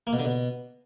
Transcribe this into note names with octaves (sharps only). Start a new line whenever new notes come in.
A#3
B2
D3
B2